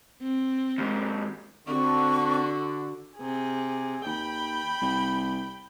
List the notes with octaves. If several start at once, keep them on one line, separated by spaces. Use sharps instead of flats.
C4
D#2 G#2
D3 C4 D4 F#4 C#6
C3 G#4
D#2 G5 B5
C2